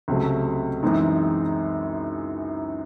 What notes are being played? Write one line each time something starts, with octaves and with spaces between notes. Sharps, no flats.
C#2 C3 F#3 A3
F#2 E3 G#3 C4 D#4